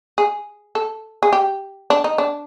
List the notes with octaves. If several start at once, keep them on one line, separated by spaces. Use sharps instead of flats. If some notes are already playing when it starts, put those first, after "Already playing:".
G#4
A4
G#4
G4
D4
D#4
D4